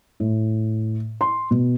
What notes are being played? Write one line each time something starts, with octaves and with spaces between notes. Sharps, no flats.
A2
C6
B2